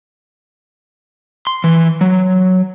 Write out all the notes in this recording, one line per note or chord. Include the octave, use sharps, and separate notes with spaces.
C6
E3
F#3